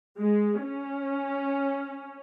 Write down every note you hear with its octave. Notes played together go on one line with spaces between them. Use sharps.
G#3
C#4